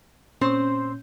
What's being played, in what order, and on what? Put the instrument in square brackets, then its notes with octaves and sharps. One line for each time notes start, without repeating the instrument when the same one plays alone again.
[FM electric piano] A#2 C#4 G6 [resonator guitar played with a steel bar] C4 C5